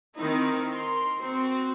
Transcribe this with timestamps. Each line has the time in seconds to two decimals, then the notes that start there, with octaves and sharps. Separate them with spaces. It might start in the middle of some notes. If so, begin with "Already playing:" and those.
0.17 D#3 C4 D#4 E4
0.70 A#4 C6
1.20 C4 F#4